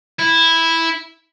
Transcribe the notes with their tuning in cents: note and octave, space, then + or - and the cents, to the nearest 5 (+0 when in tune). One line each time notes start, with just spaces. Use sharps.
E4 -5